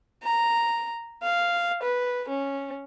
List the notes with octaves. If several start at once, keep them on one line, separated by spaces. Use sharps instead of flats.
A#5
F5
B4
C#4